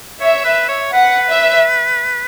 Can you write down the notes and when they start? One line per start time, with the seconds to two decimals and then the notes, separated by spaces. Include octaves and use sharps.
0.21 C#5 E5
0.44 B4
0.68 C#5
0.92 B4 F#5
1.29 E5